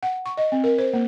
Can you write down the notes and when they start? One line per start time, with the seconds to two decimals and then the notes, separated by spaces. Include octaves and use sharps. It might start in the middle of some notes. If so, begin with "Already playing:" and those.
0.03 F#5
0.26 C#6
0.37 D#5
0.52 C4
0.64 A#4
0.78 C5
0.94 A#3